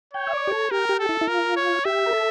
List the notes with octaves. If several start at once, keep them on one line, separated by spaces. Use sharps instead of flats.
C#5 G5
E5
D5
G4
A4
G4 A#4
G4
A4
E4
E4
F4 A#4
C#5
G4 E5
A#4
A4